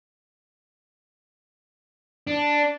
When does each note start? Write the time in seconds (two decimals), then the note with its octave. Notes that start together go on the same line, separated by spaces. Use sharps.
2.27 D4